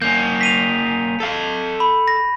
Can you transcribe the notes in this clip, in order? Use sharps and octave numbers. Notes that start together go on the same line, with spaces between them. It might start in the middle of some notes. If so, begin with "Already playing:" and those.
A#3 C#4 G6
B6 D#7 F7
A4 F5
B5
A#6